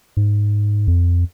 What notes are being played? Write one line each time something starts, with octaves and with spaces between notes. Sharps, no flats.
G#2
F2